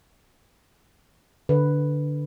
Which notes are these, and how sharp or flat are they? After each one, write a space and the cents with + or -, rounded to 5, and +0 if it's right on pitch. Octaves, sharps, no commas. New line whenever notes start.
D3 +0 B4 +0